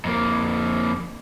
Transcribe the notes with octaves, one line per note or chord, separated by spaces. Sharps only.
F2 A#3